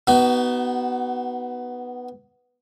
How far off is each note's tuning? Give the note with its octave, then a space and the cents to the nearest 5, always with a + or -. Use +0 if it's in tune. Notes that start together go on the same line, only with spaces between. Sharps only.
B3 +0 D#4 +0 F#4 +30